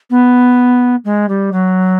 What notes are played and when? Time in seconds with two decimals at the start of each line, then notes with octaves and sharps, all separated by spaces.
0.10 B3
1.04 G#3
1.28 G3
1.52 F#3